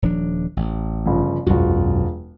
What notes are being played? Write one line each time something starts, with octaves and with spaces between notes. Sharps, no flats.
D#1 F3 D4
A1
G1 C#3 F3
E1 B1 F#2 F4 F#4